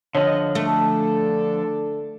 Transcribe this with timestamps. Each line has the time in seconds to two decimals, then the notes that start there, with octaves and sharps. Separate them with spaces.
0.15 D3 F3 C#5 D#5
0.55 A3 D4 A4